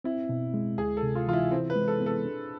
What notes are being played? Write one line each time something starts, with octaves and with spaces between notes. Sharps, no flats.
C4 E4
B2
G#3
D2 G#4
A4
C3
F4
E3 F4
E4
C4 E4
B4
G#3
A4
B3
A4
D4